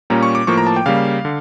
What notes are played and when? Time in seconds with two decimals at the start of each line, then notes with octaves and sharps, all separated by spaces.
0.10 A#2 G3 A#3 C#4 A#5
0.23 C#6
0.35 D6
0.47 A2 F3 A#3 C#6
0.58 A#5
0.67 A5
0.76 G5
0.86 C#3 G3 A#3 F5
1.25 D3